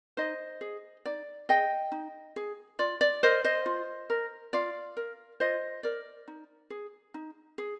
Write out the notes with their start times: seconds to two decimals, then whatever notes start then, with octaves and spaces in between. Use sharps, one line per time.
0.17 D#4 C5 D#5
0.61 G#4
1.05 D#4 D5
1.49 G#4 D#5 G5
1.92 D#4
2.36 G#4
2.79 F4 D5
3.01 D5
3.23 A#4 C5 D#5
3.44 C5 D#5
3.66 F4
4.10 A#4
4.53 F4 D5 F5
4.97 A#4
5.40 F4 C5 D#5
5.83 A#4 D5
6.28 D#4
6.70 G#4
7.14 D#4
7.58 G#4